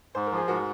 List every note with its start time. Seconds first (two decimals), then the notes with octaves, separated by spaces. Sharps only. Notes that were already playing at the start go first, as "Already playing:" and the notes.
0.15 G#2 C5
0.27 A#4
0.32 F3
0.37 G#4
0.48 G#2 F#4 A#4